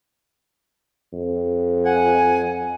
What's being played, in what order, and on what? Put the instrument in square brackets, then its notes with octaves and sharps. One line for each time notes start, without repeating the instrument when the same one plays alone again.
[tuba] F2
[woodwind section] F#5 G#5